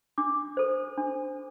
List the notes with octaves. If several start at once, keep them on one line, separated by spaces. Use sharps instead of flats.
D4 D6
A4 C5
D4